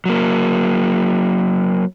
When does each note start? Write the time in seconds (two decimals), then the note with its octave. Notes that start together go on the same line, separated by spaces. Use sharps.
0.06 F#3 A#3